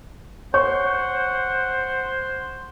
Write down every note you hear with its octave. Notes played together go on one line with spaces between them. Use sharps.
C5 C#5 F#5 C#6